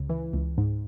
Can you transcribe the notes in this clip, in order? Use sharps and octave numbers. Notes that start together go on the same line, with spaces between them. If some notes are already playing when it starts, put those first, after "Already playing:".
Already playing: C#2 C#3
E3
C#2
G#2